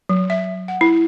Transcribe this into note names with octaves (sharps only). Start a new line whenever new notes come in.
F#3
E5
F#5
E4